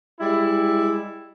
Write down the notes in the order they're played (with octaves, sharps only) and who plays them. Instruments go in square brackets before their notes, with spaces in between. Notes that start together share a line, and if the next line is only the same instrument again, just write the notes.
[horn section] G3 G#3 E4